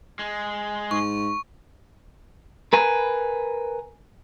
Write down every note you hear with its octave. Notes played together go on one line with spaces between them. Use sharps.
G#3
G#2 C#6
A#4 B4 G#5